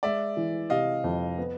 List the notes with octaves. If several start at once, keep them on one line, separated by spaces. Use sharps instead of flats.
G#3 D5 E5
E3
C3 D#5 F5
F2
B3